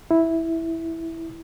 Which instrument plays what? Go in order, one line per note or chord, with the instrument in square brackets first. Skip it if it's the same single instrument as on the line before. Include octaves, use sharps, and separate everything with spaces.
[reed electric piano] E4